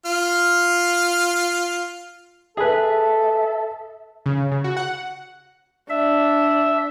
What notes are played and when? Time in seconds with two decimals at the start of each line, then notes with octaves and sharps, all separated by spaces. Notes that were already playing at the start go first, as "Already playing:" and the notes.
0.06 F4 F6
2.57 G#4 A4 B4 E5
4.26 C#3
4.52 C#3
4.64 F#4
4.77 F#5
5.90 D4 E5